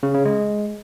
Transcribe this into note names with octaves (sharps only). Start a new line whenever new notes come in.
C#3
C#3
G#3